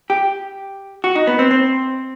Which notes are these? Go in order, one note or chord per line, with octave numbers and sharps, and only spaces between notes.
G4
F#4
D#4
B3
C4
C4